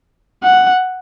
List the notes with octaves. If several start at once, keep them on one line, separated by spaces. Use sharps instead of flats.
F#5